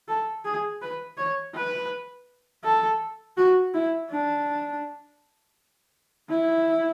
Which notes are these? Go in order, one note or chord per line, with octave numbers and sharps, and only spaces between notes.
A4
G#4
B4
C#5
B4
A4
F#4
E4
D4
E4